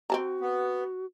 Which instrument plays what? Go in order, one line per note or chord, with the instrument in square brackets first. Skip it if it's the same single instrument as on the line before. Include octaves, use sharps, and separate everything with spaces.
[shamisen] C4 A5 A#5 [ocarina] F#4
[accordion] B3